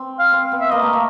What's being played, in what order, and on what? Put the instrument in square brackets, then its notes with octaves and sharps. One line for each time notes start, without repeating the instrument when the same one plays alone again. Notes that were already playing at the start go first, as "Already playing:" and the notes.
Already playing: [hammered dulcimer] C4
[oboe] F5
[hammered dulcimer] C4
B3
[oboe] E5
[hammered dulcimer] A#3 [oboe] D#5
[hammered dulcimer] A3
A#3